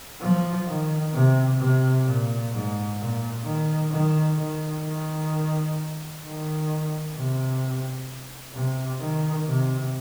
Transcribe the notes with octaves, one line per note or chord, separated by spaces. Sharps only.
F3
D#3
C3
C3
A#2
G#2
A#2
D#3
D#3
D#3
D#3
D#3
C3
C3
D#3
C3